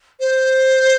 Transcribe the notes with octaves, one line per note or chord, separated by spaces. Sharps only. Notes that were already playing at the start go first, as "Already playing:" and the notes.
C5